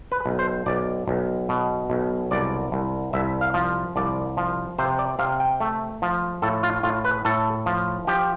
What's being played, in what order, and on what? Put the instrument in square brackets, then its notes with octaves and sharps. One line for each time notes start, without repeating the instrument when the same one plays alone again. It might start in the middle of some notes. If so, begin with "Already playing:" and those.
[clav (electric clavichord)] B4
B1
C5
B1 D5
B1
B2
B1
C2 D5
C2
C2 E5
F5
F3
C2 D5
F3
C3 C5
D5
C3 F5
G5
A3
F3
A2 A4
F4
A2 F4
B4
A2 A4
F3
F3 G4